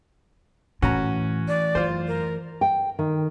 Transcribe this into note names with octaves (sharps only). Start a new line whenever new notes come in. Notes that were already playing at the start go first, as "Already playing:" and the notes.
A2 E3 A3 C#4 F#4 A#5
D5
F#2 F4 C5
A#4
G5
D#3